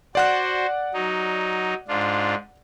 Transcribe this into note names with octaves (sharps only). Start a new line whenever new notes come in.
F#4 C5 D5 F#5 F#6
F#3 D#4
G#2 D4 F4